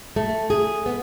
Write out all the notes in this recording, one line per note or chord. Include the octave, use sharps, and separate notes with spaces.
A3
G#4
B3